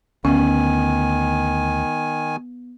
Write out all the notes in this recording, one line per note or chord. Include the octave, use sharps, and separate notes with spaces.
D2 D#3 B3 C#4 G#5